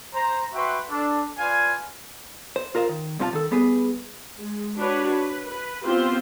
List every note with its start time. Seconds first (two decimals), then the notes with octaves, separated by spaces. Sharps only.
0.14 C5 A#5
0.54 F#4 B4 E5 G5 C6 C#6
0.89 D4 A4
1.38 F4 B4 D5 F5 G#5
2.56 C5
2.75 F4 A#4 C5 D#5 F5
2.89 D#3
3.19 G2 C3 E4 F4 A5
3.33 D#3 A4
3.51 G3 B3 G#4 B4
4.39 G#3
4.77 D4 F#4 B4 C#5
5.10 B4
5.47 B4
5.85 B3 C4 F4 G4 C5